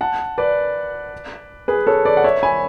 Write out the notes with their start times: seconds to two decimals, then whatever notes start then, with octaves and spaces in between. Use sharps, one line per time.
0.01 F#5 A5
0.38 B4 D5
1.68 G#4 B4
1.87 A4 C#5
2.05 B4 D5
2.17 F#5
2.24 C#5 E5
2.43 G#5 B5